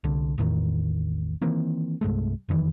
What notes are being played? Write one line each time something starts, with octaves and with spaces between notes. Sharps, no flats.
C2 D3
A1 E2 A2 D#3
D#3 E3 A#3 C4
C2 G2 G#3 A3
F#1 F2 D#3 E3